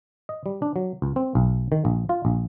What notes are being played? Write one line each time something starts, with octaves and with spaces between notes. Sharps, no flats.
D#5
G3
D4
F#3
C#2
C4
B1
D#3
A#1
F4
A#1